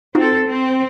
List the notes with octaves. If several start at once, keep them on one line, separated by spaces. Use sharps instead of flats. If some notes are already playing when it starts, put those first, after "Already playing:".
C4 D#4 F4 F#4 A4
C4